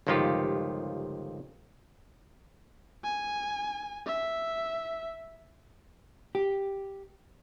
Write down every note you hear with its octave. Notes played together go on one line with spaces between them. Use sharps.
G1 C#2 D#3 F3 F4 G4
G#5
E5
G4